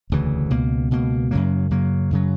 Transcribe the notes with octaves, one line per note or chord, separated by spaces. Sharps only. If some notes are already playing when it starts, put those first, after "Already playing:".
E1 D2 C#3 E3
C#2 B2 A#3
C#2 B2 A#3
F#2 C#3 F#3 A#3
F#2 C#3 F#3 A#3
F#2 C#3 F#3